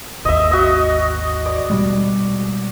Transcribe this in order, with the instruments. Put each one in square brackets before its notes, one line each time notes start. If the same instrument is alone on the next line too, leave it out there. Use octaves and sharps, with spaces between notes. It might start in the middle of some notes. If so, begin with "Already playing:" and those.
[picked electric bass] G#1 D#2 [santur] D#5 E5
[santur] F#4 D#5
D5
[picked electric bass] B2 G3 G#3